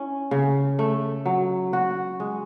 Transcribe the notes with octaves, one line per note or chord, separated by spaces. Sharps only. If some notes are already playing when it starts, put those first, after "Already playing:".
Already playing: C#4 E4
C#3
A3
F#3
F#4
G#3